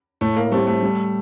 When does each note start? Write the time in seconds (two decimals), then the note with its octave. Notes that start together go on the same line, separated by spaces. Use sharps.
0.21 A2 A3
0.36 A#3
0.51 G3 A3 C4 G4
0.67 A3
0.82 G3